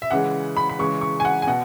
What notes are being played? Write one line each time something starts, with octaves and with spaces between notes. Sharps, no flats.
E5
C#3 E3 G#3 F#5
B5
B5
C#3 E3 G#3 C#6
C#6
G#5
F#5
G#5
B2 F#5